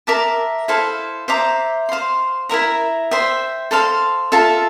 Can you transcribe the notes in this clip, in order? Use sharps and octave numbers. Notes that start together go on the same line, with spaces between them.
A#4 E5 A5 D6
E4 A4 C5 F5
C5 E5 A#5 D6
C5 F5 C6
E4 A#4 E5 A#5
C5 E5 G5
A4 C5 F5 C6
F4 A4 E5 A5